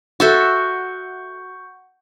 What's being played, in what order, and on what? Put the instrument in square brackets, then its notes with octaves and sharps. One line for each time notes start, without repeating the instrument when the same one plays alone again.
[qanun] F#4 A4 E5 [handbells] F#5 C#6 G6